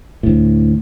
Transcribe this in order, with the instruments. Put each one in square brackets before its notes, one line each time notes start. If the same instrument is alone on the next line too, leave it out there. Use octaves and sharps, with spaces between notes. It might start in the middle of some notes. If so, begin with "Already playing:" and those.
[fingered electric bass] D2 A2